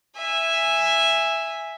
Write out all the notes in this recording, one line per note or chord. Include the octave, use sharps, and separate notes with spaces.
E5 G#5